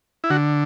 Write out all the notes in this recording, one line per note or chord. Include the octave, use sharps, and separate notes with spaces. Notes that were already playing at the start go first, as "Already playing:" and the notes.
E4
D3 F#4